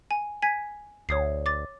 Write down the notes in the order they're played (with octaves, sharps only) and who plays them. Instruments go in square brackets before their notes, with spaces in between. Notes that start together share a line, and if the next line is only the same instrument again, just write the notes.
[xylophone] G#5
G#5 G#6 B6
[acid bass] D2 [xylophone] C#5 D#6 C7
[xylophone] D6 A6